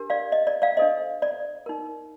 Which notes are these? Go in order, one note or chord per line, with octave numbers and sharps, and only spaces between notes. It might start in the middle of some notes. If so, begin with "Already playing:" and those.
Already playing: D4 G4 A#4
D5 F5
D#5
D5
D5 F5
D4 A4 C5 D#5
D5
D#4 A#4